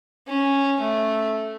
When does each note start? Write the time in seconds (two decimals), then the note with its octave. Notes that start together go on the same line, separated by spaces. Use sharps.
0.27 C#4
0.80 A3